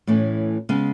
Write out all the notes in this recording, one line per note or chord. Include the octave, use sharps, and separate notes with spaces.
A2 E3 A3 C#4
C#3 G#3 B3